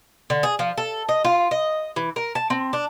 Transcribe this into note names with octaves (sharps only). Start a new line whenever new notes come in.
D3
G#4
F3
A4
D#5
F4
D#5
E3
A#4
A5
C4
D4